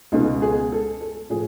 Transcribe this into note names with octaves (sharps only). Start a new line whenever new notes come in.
C#2 B2 G#3 D#4
G#4
A4
A4
A2 F3 G#4